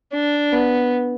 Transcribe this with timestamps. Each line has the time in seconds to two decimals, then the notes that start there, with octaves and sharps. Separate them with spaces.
0.13 D4
0.52 B3